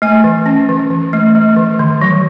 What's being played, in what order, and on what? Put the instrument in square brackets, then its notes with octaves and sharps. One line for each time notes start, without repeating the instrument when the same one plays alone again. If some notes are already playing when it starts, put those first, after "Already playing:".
[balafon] A3 G#5
E3
C#4
E3
E3
A3
A3
E3
D#3
F#3